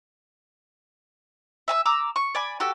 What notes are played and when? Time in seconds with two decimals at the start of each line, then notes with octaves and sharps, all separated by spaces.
1.68 E5 G#5 A5 E6
1.86 A#5 D6 E6
2.16 C#6
2.35 D5 G#5 B5
2.60 F#4 G4 A4